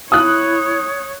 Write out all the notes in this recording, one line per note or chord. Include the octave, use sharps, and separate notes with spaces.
E4 C#5 D#6 F#6